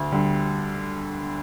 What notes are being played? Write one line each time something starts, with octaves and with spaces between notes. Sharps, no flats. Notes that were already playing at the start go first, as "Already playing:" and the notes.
Already playing: D2
D3 G3